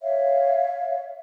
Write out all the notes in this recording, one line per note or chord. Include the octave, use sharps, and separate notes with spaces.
C#5 E5 F5